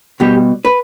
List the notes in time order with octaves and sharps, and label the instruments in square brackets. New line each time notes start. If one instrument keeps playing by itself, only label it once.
[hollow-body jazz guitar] B2 G3 G4
B4